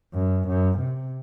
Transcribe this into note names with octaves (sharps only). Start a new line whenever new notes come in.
F#2
F#2
C3